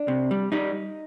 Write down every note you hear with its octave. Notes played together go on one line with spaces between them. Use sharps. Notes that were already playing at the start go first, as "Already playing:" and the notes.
Already playing: D4
C3
G3
G3 D#4